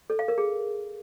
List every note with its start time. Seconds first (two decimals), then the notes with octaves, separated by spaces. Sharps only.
0.10 A4
0.19 F5
0.28 A#4
0.38 G#4